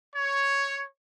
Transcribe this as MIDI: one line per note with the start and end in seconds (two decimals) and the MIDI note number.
0.16 0.85 73